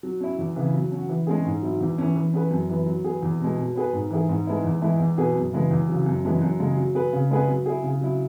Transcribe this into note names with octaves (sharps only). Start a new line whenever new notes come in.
F#3
C#4 E4
E2
C#3 E3
F#3
C#4 F#4
E3
G#3 C#4 G#4
G#2
F#3 E4
E2
E3 C#4
E3
C#4 G#4 B4
F#2
E3 B3
F#3
B3 G#4
E2
B2 G#3
B2
B3 G#4 B4
G#2
E3 B3 E4 G#4
G#2
G#3 B3 E4
E2
E3 G#3 E4
E2
B2 B3 G#4 B4
F#2
C#3 E3 G#3 B3
E2
C#3 F#3
F#2
E3 G#3 C#4
F#2
C#3 G#3
F#3
B3 G#4 B4
C#3
G#3 B3 G#4 B4
F#3
E4 G#4
C#3
F#3 E4